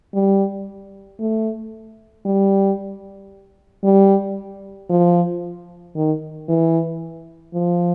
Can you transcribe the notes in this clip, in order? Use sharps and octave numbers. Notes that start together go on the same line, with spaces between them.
G3
A3
G3
G3
F3
D#3
E3
F3